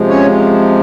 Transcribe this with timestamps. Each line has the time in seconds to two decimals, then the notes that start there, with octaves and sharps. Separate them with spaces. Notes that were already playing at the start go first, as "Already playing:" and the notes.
Already playing: C3 F3 G#3
0.08 C#4 C#5